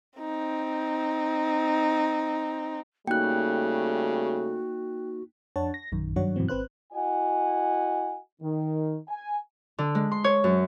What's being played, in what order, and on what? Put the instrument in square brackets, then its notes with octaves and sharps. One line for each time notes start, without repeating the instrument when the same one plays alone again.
[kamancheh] C4 D#4
[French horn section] C#3 G3 A3 [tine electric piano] A#3 D#4 [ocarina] F#4 [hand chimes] G5 F#6
[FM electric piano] F2 D4 C#5 F#5 A5
A#6
A#1 F#2 D#3
G2 D#3 F#3 D4 C#5 F#5
G2 B2 E3 F#3 C4
G#1 C4 B4 C5 F#6
[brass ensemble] E4 F#4 D#5 F#5 G#5
D#3
G#5
[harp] D3
G#3
C6
C#5
F#2